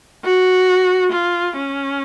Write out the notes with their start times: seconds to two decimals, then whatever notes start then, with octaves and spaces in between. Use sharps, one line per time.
0.24 F#4
1.12 F4
1.56 C#4